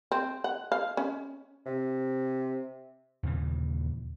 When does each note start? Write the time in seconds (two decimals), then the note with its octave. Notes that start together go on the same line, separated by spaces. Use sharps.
0.12 C4
0.44 F#5
0.72 F5
0.97 C#4
1.66 C3
3.23 D#2 A#2 C#3 E3